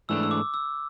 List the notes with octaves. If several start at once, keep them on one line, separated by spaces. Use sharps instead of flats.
G#2 E3 A3 D4 E6
E6
D6
E6